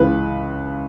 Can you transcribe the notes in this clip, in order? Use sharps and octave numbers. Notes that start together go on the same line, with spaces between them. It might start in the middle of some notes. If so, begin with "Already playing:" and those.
Already playing: C#2 C#3 E3 B4